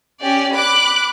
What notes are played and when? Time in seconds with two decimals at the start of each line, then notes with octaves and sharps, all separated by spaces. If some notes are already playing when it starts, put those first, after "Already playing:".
0.21 C#4 G4 D5
0.53 B5 D6 F#6